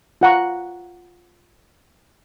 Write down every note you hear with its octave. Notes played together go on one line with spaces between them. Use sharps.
F4 F#5 A#5 C#6